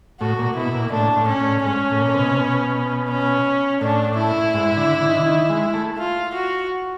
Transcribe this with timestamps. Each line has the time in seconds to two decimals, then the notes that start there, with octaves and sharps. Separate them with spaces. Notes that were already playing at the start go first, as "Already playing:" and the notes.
0.20 A2 F#4
0.39 A#2
0.56 B2 E4
0.75 A#2
0.92 A2 D4
1.16 A2
1.29 C#4
1.41 A2
1.64 G#2 C#4
1.91 A2
2.01 A#2
2.14 C3
2.19 B2
2.29 C3
2.37 B2
3.09 C#4
3.81 A2 D4
4.18 E4
4.54 G#2
4.77 D3
5.01 D3
5.09 D#3
5.17 D3
5.26 D#3
5.50 G#3
5.74 A3
5.98 F4
6.34 F#4